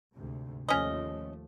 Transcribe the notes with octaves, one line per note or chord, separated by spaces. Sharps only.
D2 G#2 C3
D#2 F3 A3 C#4 D#5